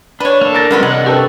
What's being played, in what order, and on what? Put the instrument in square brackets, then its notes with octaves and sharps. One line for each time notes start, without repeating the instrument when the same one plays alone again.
[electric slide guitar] D4 [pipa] B4 C#5
[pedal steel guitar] A#3 A4
[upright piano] A#4 A6 A#6
[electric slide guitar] G3 G#3 [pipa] A#3 B3 F4 [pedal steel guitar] C#4
[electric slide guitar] C3 D4 [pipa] G#3 [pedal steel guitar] F#5
[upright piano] G4 A4 B4 [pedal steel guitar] D5 C#6 E6